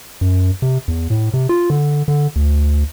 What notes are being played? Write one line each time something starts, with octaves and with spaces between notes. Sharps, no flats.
F#2
C3
E2
A2
C3
F4
D3
D3
D2